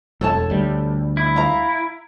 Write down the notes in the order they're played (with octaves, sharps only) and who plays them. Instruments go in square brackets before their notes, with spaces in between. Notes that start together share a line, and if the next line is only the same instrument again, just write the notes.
[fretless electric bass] E1 [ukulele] A4 C#5 A5
[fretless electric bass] D2 G3
[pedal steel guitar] E4
[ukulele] F5 A#5